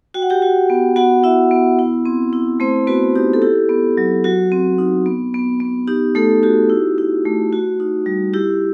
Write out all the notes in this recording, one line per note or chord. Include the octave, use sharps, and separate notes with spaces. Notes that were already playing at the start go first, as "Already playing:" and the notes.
F#4 G5
F#5
G4 G5
F#4
B3
B3 F#4 F#5
E4 F#4 E5
B3
E4
C4
E4
A3 C4 C5
B3 F#4 B4
D#4 G4
A4
E4 G4
B3
F#3
F#3 F#4
C4
D#4
B3
B3
B3
D#4 G4
A3 D#4 A4
F#4 G4
E4
E4
A3
F#4
D#4
G3
E4 G4